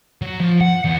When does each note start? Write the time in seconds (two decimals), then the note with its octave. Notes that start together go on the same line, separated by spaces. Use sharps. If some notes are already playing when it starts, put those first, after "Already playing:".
0.22 F#3
0.40 F3
0.61 F#5
0.84 E2